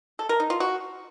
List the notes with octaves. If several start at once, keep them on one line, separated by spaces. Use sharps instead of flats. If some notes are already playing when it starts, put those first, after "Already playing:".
A4
A#4
D#4
F4
F#4